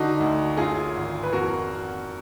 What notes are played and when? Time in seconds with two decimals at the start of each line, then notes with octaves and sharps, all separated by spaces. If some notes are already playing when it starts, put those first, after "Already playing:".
Already playing: D3 D#4 F#4
0.20 D2
0.57 F#2 F4 G#4
0.95 G#1
1.23 B4
1.32 F2 F#4 A#4